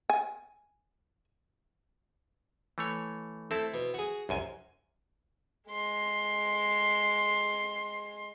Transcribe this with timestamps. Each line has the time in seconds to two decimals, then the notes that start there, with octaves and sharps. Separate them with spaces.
0.10 G#5
2.78 E3 A3 C#5
3.51 A3 C4 E4 A4
3.74 B2
3.94 F#4 G#4
4.29 C2 F#2 G#5 C6
5.69 G#3 C6